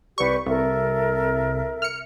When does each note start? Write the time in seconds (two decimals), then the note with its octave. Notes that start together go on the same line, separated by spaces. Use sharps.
0.18 C2 G4 B4 D5 C#6
0.46 C2 A4 A#4 E5
1.82 F6 C#7